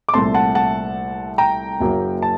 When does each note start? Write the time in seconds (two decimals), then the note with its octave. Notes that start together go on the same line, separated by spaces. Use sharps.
0.09 D6
0.14 C2 A#2 A3 C4 A5 C6
0.34 F#5 A5
0.55 F#5 A5
1.38 G5 A#5
1.80 F#1 F#2 F#3 A#3
2.22 A5